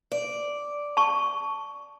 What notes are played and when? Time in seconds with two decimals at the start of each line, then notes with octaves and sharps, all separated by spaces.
0.12 D5
0.97 A5 C#6